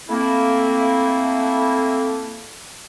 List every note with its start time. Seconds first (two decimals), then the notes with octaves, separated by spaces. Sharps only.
0.09 A3 A#3 C4 E4